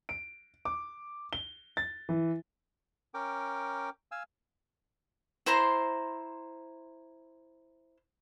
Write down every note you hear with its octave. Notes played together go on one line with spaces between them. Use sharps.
D7
D6
G7
A6
E3
C#4 A#4 G5 D6
F5 G#5 E6
E4 C5 A#5 C6